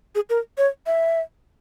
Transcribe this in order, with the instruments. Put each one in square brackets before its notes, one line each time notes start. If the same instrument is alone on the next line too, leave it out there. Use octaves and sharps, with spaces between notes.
[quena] G#4
A#4
C#5
E5